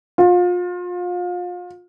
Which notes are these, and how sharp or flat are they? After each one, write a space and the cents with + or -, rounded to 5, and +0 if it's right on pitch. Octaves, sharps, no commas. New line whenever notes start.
F4 +30